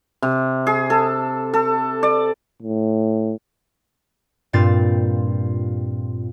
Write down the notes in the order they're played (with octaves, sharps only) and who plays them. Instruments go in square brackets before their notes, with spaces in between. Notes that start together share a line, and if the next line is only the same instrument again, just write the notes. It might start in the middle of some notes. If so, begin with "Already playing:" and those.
[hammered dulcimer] C3
G#4
A4
A4
D5
[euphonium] A2
[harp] G2 A#2 C4 F4 A6